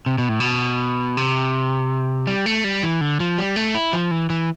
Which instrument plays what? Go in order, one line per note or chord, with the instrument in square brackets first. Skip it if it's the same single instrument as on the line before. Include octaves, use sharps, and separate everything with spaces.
[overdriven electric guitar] C3
B2
A2
B2
C3
G3
A3
G3
E3
D3
F3
G3
A3
E4
F3
E3
E3